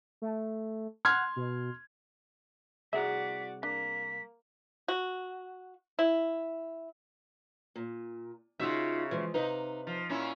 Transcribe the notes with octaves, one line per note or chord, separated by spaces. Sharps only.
A3
F#5 C6 F6 G#6
B2
C2 F#4 G#4 D5 E5 A#5 B6
A#3 D4 B6
F#4
E4
A#2
C#3 D#4 F4 F#4 E5
E3 F3 G#3
C3 D#4 B4 F5
F3
A#2 C#4 E4